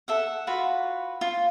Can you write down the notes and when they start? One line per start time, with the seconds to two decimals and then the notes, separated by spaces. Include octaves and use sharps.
0.08 A4 E5 F#5
0.47 F4 F#4 B4 B5
1.21 F4